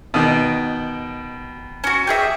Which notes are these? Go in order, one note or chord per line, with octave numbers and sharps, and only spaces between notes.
B2 D#3
C#4 F#4
G4 G#4 E5